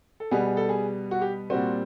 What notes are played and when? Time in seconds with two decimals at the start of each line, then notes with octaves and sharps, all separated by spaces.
0.20 A4
0.31 B2 G3 B3 G#4
0.47 G#4
0.57 A4
0.69 G#4
1.11 F#4
1.21 G4
1.50 A#2 G3 C4 F#4